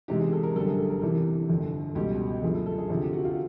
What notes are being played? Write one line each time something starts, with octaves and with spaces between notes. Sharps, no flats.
E2 C3 D#3 G#3 G4
G#4
A4
A#4
G1 F#2 D3 G3 A4
G#4
A4
A#4
E2 C3 E3 A4
G1 F2 D3
C#2 B2 G3 G4
G1 F#2 D3 F3 A3 G#4
A4
A4
G#4
D2 C3 F3 G#4
G4
F#4
F4